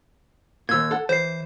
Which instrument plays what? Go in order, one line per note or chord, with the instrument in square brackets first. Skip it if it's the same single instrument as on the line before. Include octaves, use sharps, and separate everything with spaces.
[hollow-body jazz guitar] D#2 A#2 [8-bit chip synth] E6 G#6
[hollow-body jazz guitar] A4 F#5
[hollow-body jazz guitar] E3 [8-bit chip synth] C5 C7